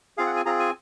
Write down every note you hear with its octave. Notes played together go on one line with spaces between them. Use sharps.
C4 F4 G#4 F5
F#5
G#5
C4 F4 G#4 A#5
G#5